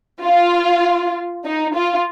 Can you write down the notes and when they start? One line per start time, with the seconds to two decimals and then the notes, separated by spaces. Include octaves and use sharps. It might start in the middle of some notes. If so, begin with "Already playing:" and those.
0.24 F4
1.44 D#4
1.75 F4